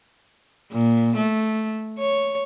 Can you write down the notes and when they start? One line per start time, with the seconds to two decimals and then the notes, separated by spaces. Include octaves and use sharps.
0.72 A#2
1.17 A3
1.99 C#5